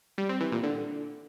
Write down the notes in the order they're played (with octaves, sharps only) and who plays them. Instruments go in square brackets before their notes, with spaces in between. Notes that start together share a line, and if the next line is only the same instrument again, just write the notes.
[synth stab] G3
C4
E3
A#2
D3